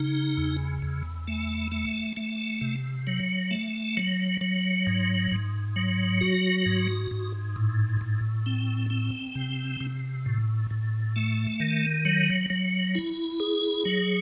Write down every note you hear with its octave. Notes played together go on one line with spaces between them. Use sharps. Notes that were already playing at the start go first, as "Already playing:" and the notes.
Already playing: C#3 D#4
E2
E2
A3
A3
A3
C3
F#3
A3
F#3
F#3
G#2
G#2
F#3
F#4
G#2
G#2
A2
A2
C4
C4
C3
C3
A2
A2
A3
D#3
F#3
F#3
E4
G#4
F#3